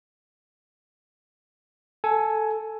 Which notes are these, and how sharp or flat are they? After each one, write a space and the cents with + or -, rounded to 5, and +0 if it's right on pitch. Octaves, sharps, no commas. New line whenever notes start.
A4 +0 G#5 +15